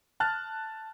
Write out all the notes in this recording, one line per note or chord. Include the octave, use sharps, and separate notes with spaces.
A5 F6 F#6 A6